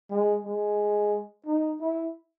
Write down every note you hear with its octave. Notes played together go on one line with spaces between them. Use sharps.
G#3
G#3
D#4
E4